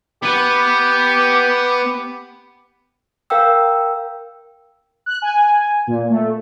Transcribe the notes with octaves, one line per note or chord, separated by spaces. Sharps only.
B3 G4 B4
A#4 F5 G5 E6
F#6
G#5
A#2
A3